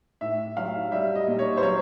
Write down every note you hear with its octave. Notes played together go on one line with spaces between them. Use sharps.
A2 E5
F#3 F5
G3 E5
D#5
A#2
C#5
C5
F#3 C#5